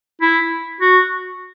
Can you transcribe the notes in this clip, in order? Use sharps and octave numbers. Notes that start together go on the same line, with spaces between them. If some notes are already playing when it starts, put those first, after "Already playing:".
E4
F#4